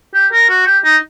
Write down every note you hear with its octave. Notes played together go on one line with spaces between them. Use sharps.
G4
A#4
F#4
G4
D#4